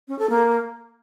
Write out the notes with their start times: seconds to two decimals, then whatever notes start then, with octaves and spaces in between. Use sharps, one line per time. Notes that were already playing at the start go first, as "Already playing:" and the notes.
0.08 C#4
0.19 A4
0.30 A#3